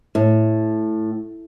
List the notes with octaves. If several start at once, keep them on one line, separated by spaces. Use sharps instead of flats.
A2